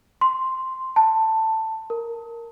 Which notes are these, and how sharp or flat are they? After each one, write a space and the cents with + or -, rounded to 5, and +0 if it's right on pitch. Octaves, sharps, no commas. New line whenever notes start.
C6 +0
A5 +10
A#4 -5